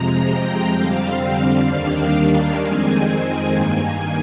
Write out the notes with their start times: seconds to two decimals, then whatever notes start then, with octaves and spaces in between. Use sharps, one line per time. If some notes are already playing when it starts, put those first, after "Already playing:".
Already playing: F2 C3 F3 G#3 A#5
0.25 G5
0.72 F2 D3 G3 C4 F5
1.65 D#2 D#3 G3 A#3 D4
2.13 F5
2.59 F2 D#3 G#3 C4 G#5
3.52 G2 D#3 A#3